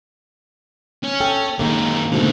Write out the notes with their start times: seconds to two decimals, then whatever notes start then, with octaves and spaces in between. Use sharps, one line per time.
1.03 C#4
1.20 A4 G5
1.59 F#2 D#3 G#3 A#3
2.12 G#2 B2 D3 A3 A#3